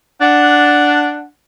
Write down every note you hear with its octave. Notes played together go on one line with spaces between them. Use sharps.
D4 F#5